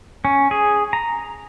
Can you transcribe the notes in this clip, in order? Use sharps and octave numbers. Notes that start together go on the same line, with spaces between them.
C#4
G#4
A#5